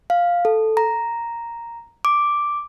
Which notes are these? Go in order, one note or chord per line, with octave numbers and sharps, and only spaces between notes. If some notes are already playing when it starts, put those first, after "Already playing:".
F5
A4
A#5
D6